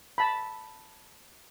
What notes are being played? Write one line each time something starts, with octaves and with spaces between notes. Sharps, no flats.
A5 B5